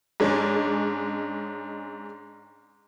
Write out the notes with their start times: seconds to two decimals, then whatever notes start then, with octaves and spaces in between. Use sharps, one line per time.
0.20 G#2 G#3 C#4 D4